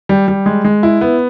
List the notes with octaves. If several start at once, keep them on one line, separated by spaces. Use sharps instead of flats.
G3
G3
G#3
G#3
E4
B3